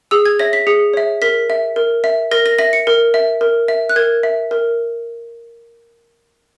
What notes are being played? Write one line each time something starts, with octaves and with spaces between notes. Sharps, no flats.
G#4 E6
G#6
C#5 E5 A#6
B6
G#4 C#7
C#5 E5
A#4 B6
E5
A#4
E5
A#4 A#6
A#6
E5 A#6
C#7
A#4
E5
A#4
E5
F#6
A#4 G#6
E5
A#4